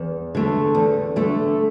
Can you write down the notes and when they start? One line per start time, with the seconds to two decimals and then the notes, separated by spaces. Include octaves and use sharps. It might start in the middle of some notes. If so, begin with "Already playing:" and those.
Already playing: E2
0.35 D3 A3
0.75 E2
1.16 D3 A3